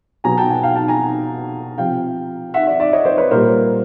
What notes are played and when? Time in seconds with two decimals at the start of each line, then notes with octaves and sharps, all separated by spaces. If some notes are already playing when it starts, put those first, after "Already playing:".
0.24 B2 F#3 G#5 A#5
0.37 G5 A5
0.50 F#5 G#5
0.63 F5 G5
0.76 G5 A5
0.88 G#5 A#5
1.78 C3 F3 F5 G5
2.54 E5 F#5
2.67 D5 E5
2.80 D5 E5
2.93 C#5 D#5
3.05 C5 D5
3.18 B4 C#5
3.31 A#2 G3 A#4 C5